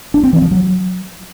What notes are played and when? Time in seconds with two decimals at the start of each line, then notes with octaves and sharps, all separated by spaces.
0.14 D4
0.23 C4
0.33 E3
0.42 F3
0.51 F#3